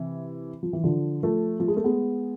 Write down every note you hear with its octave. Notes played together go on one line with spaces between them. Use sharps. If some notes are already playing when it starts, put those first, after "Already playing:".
Already playing: C3 E3
F3
E3
D3 F3
F3 A3
F3
G#3
A3
G#3 B3